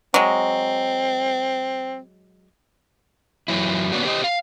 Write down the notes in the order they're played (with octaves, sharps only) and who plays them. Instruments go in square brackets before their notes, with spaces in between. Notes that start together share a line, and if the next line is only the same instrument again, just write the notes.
[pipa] F#3 G#3 [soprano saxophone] C4
[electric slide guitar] F#2 E3 F#3 E4
A#3 B3 C#4 D4 F#4
G4 C5 C#5 D#5
F5